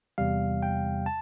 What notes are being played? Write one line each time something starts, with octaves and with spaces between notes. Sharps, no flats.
E2 C3 G3 F5
G5
A5